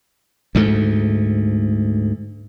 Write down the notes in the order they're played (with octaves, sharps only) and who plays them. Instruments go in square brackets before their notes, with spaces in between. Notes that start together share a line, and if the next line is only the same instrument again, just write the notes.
[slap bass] D2 G#2 A3